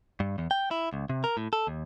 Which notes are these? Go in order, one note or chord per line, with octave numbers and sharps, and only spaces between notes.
G2
E2
G5
E4
C#2
C3
A#4
A2
A4
D#2